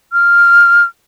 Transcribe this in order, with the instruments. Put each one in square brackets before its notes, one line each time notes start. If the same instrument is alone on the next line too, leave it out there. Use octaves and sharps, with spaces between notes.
[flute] F6